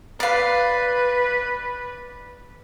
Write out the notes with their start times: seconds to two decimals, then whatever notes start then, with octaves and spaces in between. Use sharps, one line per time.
0.20 B4 D5 F5